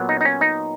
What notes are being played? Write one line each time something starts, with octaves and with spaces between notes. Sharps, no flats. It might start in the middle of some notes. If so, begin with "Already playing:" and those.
Already playing: A#2 F#3 B3
D#4
D#4
C#4
D#4